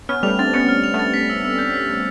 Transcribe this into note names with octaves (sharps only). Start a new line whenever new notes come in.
B3 C#4 F6
G3 A3 F7
C4 D4 A6
B3 C#4 C#7
F6
F7
A3 B3
A6
B6
E6
E6
G6
B6
E6